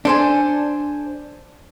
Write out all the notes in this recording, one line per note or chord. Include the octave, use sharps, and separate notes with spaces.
D4 A4 C5 G#5